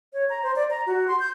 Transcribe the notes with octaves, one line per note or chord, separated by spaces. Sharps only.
C#5
A#5
C5
D5
A#5
F#4
C6
G6